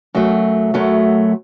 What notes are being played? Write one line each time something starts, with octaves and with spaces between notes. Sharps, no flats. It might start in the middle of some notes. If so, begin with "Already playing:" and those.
F#2 F#3 A3
F#2 F#3 A3